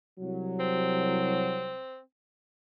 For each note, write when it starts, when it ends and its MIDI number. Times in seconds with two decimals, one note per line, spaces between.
0.20 1.79 36
0.20 1.79 54
0.60 2.00 60